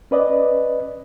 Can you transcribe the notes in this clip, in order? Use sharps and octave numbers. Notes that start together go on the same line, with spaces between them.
C#4 B4 D5 D#5